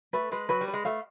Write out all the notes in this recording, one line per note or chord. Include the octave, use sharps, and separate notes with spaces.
A3 B4
G#3 B4
F#3 B4
G3
B4
G#3
A3 F5